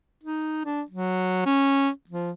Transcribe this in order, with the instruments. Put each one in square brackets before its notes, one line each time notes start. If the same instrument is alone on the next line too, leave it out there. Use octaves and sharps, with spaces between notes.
[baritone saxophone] D#4
D4
F#3
C#4
F3